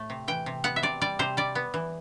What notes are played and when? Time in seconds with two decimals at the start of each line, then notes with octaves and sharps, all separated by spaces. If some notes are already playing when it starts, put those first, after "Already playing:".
Already playing: A2 A3
0.10 C3
0.28 E3 G5
0.46 C3
0.64 B3 F#5
0.76 E5
0.83 C3 D5
1.01 G3 D5
1.19 C3 C5
1.37 G3 D5
1.55 B3
1.74 E3